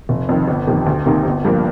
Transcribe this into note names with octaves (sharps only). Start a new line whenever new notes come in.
F1
F2 D#3
G1
F2 C3 D#3
D2
C3 D#3 A#3 D#4
G1
G2 F3 A#3